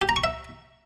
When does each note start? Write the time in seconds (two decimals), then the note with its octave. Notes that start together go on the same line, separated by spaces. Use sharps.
0.02 G4
0.09 A#5
0.16 C#6
0.24 E5